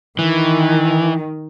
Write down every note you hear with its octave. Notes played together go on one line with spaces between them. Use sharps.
D#3 E3